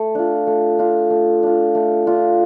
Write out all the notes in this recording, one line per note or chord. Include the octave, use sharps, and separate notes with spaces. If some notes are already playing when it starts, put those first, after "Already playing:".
Already playing: A3
D4 F4
A3
D4 F4
A3
D4 F4
A3
D4 F4